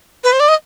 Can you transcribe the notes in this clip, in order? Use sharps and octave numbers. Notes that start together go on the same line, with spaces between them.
B4
C5
D5
D#5